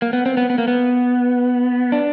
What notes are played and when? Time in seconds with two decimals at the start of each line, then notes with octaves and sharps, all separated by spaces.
0.02 A#3
0.13 B3
0.26 C4
0.37 B3
0.50 B3
0.58 A#3
0.68 B3
1.92 D4